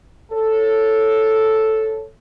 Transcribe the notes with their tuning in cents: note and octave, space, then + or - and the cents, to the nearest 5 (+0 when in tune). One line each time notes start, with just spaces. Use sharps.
A4 +0 C#5 +0